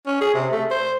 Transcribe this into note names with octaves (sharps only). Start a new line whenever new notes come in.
C#4
G#4
C3
A3
C5